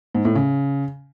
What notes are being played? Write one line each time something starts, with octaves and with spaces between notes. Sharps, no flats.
G#2
A2
C#3